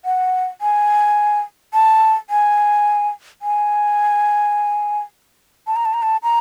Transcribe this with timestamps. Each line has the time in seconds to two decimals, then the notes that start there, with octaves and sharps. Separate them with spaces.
0.05 F#5
0.61 G#5
1.74 A5
2.30 G#5
3.42 G#5
5.67 A5
5.76 A#5
5.85 A5
5.94 A#5
6.02 A5
6.23 A#5